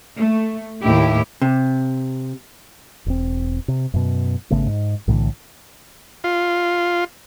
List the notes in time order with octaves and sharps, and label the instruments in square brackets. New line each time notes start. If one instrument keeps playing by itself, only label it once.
[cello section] A3
D#2 A2 E4 G4
[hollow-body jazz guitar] C3
[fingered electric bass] E1 C4
C3
F#2 B2
G#1 C#3 A3 B3
G#2
B1 A2 D3 E3
[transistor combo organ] F4